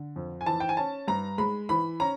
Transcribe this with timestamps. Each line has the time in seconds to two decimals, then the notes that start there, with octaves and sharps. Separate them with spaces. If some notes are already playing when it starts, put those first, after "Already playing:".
Already playing: D3
0.16 F2
0.41 G#5
0.46 E3 A5
0.60 G5
0.69 G#5
0.77 C#4 A5
1.08 G2 A#5
1.38 G#3 B5
1.69 E3 B5
2.00 C#4 A#5